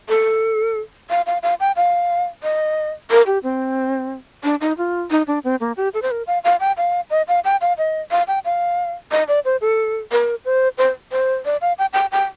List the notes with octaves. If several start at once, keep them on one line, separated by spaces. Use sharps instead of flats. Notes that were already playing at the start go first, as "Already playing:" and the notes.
A4
F5
F5
F5
G5
F5
D#5
A#4
G4
C4
D4
D#4
F4
D#4
D4
C4
A#3
G4
A4
C5
A#4
F5
F5
G5
F5
D#5
F5
G5
F5
D#5
F5
G5
F5
D#5
D5
C5
A4
A#4
C5
C5
C5
D5
F5
G5
G5
G5